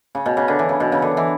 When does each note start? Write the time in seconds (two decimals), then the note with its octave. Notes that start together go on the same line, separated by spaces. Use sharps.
0.15 C#3
0.26 B2
0.37 C#3
0.48 D3
0.59 E3
0.69 C#3
0.80 B2
0.92 C#3
1.02 D3
1.17 E3